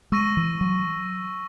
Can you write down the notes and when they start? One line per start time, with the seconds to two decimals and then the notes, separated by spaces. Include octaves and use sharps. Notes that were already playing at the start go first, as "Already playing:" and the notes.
0.12 G#3 C#6 E6 A#6 D#7
0.37 E3
0.61 F#3